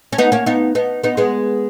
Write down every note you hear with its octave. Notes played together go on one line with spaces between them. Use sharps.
C#4
B3 D#4
A#3 C#4
B3 D#4
B3 D#4
B3 D#4
G#3 B3